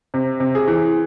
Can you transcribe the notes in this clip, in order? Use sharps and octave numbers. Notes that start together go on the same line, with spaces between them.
C3
C3
G#4
E3